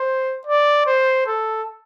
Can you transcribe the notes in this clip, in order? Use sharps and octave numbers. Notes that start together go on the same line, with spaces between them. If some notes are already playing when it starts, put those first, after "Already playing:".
Already playing: C5
D5
C5
A4